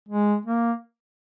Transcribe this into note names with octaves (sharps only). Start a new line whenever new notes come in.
G#3
A#3